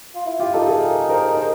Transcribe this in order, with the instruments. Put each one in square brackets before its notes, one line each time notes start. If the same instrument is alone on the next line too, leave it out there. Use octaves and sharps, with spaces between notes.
[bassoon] F4
E4
[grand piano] F4 G4
[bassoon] D#4 [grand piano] G4 A4
[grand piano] G#4 A#4
A#4 C5
A#4 C5